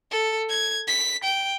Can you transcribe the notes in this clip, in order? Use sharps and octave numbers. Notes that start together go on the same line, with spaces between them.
A4
G#6
B6
G5